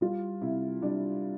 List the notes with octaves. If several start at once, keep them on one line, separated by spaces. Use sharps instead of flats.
G3 F4
C3 E4
G3 D4